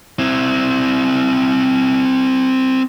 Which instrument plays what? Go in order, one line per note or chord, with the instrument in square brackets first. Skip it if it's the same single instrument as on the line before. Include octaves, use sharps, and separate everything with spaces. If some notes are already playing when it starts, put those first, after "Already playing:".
[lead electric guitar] C4 E4